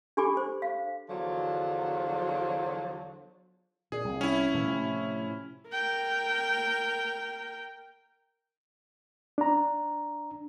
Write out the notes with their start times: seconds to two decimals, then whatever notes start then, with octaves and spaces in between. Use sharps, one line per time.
0.17 D4 G4 A4 G#5 B5 D6
0.37 C5
0.62 F5
1.09 E2 D3 F3 F#3
3.92 A#2 G#4
4.05 C2
4.21 C#4 E4
4.54 A#2 E3 A#3
4.67 A2 C3 F3
5.70 A#4 G5
9.38 D4 A#5